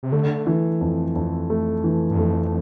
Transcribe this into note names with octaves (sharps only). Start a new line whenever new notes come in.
C3
D3 A3
E3
F2
F2
A3
E3
G2
F2 A3